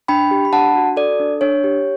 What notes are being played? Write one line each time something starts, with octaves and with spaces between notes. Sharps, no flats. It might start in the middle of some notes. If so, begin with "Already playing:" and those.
D4 G5 B5
G4
B5
D4 F#5 A5
F#4
A4 D5
D4
D4 C#5
G4